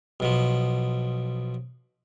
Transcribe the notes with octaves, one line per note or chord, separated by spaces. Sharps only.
B1 B2 F3